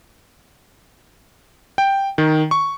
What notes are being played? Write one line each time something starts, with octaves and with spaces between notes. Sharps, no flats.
G5
D#3
C#6